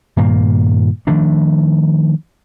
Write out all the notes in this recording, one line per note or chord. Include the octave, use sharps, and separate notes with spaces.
G2 A#2 D#3 A#3
D#3 F3 A3 D4